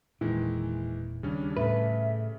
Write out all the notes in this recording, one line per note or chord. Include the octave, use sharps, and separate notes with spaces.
E1 A#2 D#3 E3 G#3 E4
D#2 C#3 G3 C#4 D4
A2 A4 B4 E5